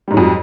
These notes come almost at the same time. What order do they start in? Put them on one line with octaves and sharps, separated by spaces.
G3 G#2 F#3 F2